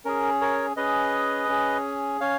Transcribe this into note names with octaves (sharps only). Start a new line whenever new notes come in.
C#4 G#4 A#4
A#4 C#5
C#4 G#4 B4 D#5
C#4 G#4
C#4 C#5 F5